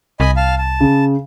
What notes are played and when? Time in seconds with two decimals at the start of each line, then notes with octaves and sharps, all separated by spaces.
0.20 C2 D#5 G#5 B5
0.37 F5 A5
0.58 A5
0.80 C#3